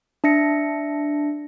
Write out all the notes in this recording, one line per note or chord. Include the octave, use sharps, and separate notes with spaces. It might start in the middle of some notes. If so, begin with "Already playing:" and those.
D4 E5 A#6 C#7